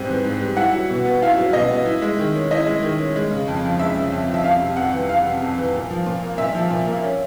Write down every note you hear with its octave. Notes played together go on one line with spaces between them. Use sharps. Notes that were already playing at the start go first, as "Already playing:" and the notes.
Already playing: G#2 G3 C4
E3
G#2
G3
E4 F#5
F#3
B2
B3
E4 F5
F#3
B2 D#5
B3
E4
G#3
D#3
C#4
E4 D#5
G#3
D#3
C#4
G#3
C#3
F2
F3
G#3 E5
C#3
F2
F3
E5
F2 F5
C3
F2 F#5
E3
F2 F5
C3
F2
E3
A#2
F3
A#2
A#3
A#2 E5
F3
A#2
A#3
C#4